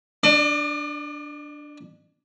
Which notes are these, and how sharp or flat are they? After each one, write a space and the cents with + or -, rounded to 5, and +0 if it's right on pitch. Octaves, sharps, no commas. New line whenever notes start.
D4 +0 D5 +45